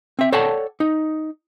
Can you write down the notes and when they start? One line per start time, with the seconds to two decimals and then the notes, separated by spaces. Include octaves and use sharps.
0.19 C4 E5
0.32 A4 C#5 D5 F#5 G5 A5
0.80 D#4